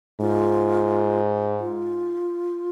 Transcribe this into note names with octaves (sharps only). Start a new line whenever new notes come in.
G#2 F4
F4